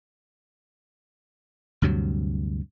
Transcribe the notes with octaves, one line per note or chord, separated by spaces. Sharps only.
D2 G2 C3 F#3